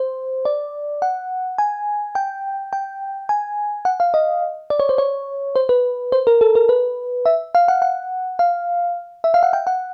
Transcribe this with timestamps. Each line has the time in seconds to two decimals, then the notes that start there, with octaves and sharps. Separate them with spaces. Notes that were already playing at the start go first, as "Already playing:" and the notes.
Already playing: C5
0.45 D5
1.02 F#5
1.58 G#5
2.15 G5
2.73 G5
3.29 G#5
3.85 F#5
4.00 F5
4.14 D#5
4.70 D5
4.80 C#5
4.89 C5
4.98 C#5
5.56 C5
5.69 B4
6.12 C5
6.27 A#4
6.41 A4
6.55 A#4
6.69 B4
7.26 E5
7.55 F5
7.68 F#5
7.82 F#5
8.39 F5
9.24 E5
9.34 F5
9.43 F#5
9.53 G5
9.67 F#5